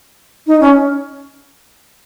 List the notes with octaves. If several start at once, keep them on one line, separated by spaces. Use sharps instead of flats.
D#4
C#4